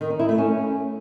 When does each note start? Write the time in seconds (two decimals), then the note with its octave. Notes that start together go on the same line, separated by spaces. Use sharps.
0.01 D#3
0.10 D#4
0.19 E4
0.29 A3
0.38 C#4